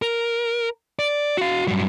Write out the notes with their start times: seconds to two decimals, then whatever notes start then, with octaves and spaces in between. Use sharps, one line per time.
0.02 A#4
0.99 D5
1.37 F#4 F5
1.68 G2 F#3